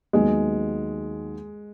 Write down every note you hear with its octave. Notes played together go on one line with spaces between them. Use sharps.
D#2 D#3 F#3 G#3 B3